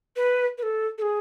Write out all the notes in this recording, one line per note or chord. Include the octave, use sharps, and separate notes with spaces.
B4
B4
A4
A4
G#4